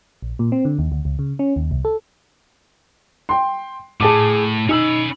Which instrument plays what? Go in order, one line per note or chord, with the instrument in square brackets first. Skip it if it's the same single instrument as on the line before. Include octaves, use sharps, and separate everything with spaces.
[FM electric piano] A#1
A#2
C4
D3
D#2
D2
C#2
C#3
C#4
D#2
C2
A4
[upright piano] G5 C6
[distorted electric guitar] A2 [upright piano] G#4 A5 D6
[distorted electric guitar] C#4 B5 [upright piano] D#4 E6